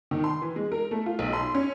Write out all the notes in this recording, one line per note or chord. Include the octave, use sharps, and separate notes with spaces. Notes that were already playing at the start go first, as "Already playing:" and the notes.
D#3
C6
E3
G#3
A#4
A3
F4
B1
C6
C#4